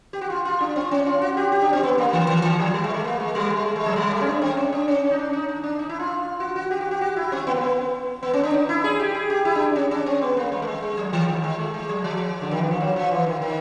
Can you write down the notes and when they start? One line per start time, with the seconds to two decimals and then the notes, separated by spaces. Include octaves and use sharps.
0.13 G4
0.21 F#4
0.30 F4
0.45 F4
0.61 D4
0.76 C4
0.91 C#4
1.06 F4
1.22 F#4
1.37 G4
1.52 G4
1.62 D4
1.73 C4
1.83 B3
1.98 A#3
2.13 E3
2.29 E3
2.44 E3
2.59 F#3
2.74 G3
2.84 G#3
2.94 A3
3.04 A#3
3.20 G#3
3.35 G3
3.46 A3
3.50 G#3
3.66 A3
3.76 G#3
3.86 F#3
3.96 G3
4.11 A3
4.21 C#4
4.27 D4
4.42 C4
4.57 C#4
4.73 D4
4.88 C#4
5.11 D#4
5.18 D4
5.33 D#4
5.49 D#4
5.64 D4
5.79 D#4
5.89 E4
5.99 F4
6.40 F#4
6.56 F#4
6.71 G4
6.81 F#4
6.91 G4
7.01 F#4
7.16 E4
7.32 C4
7.47 B3
7.54 A#3
7.61 B3
8.23 B3
8.33 C#4
8.43 D4
8.54 D#4
8.69 E4
8.84 G#4
9.00 G4
9.15 G#4
9.30 G4
9.45 E4
9.55 D4
9.76 C#4
9.91 C#4
10.06 C4
10.21 B3
10.37 A#3
10.52 G#3
10.62 A3
10.67 G#3
10.83 G#3
10.97 F#3
11.13 E3
11.28 D#3
11.44 G#3
11.59 A3
11.74 G#3
11.89 F#3
12.04 F3
12.41 D3
12.51 D#3
12.61 E3
12.71 F3
12.80 F#3
12.96 F3
13.11 E3
13.27 D#3
13.42 D#3